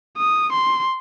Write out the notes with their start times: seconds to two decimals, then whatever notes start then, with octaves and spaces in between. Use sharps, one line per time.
0.17 D#6
0.53 C6